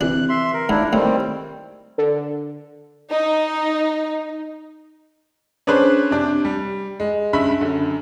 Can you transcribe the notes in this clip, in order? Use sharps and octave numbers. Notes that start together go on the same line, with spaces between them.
C3 E3 D4 F#6
E5 C6
A#4
D#2 G#2 D4 E4
A2 D#3 G3 C4
D3
D#4
C#4 D4 G#4 B4 C5
C3 D4
G3
G#3
G2 C#3 E5 B5
F#2 D3